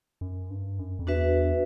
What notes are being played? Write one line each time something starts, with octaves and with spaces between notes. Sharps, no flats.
F#2
G2
F#2
F2
E2 D4 F#4 B4 E5